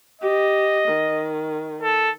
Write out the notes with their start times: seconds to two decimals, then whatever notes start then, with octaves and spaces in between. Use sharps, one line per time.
0.21 G4 D#5
0.88 D#3
1.83 A4